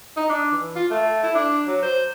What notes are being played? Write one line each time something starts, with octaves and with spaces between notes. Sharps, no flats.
D#4
D4
E3
F4
A3
E4
D4
F#3
C5